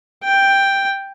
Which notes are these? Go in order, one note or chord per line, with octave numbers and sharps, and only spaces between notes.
G5